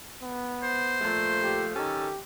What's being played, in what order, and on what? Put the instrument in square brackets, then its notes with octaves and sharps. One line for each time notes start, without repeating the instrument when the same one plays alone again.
[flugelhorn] B3
[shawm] C5
[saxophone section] A#2 F3 A3
[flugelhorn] G4
[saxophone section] D#3 C#4 A4 [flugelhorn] G4